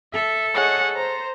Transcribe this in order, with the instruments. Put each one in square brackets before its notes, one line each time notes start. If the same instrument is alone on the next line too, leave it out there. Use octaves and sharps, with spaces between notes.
[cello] A4 [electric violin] E5
[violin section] G#4 C#5 D#5 [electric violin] F#5
[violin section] C5 [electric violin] A#5